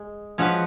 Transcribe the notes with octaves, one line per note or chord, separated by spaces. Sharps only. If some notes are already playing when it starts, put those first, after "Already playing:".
Already playing: G#3
F3 G#3 C#4 F#4 B4